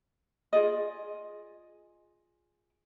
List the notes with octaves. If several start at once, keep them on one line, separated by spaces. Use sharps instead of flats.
F4 G#4 D5 D#5